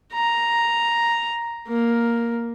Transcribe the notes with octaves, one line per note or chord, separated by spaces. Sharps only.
A#5
A#3